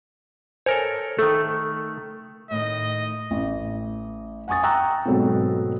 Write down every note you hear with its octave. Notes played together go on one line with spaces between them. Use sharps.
A4 A#4 C5 C#5 G#5
D#3 A3 A4
A2 D#3 D#5
A1
F#5 G#5 C#6 D#6 A6
G5 A#5 C#6 E6 F#6
G#2 B2 F#3 A3 B3 C4